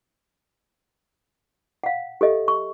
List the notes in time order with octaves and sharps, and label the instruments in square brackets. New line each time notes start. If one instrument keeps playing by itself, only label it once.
[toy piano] F5 F#5
G4 A4 D#5 E5
C#6